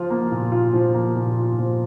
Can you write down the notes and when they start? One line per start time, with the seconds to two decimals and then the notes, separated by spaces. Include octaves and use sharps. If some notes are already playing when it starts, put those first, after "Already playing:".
Already playing: F3 F4
0.10 A#3
0.31 A#2
0.52 F4
0.73 F3
0.95 A#3
1.16 A#2
1.37 F4
1.58 F3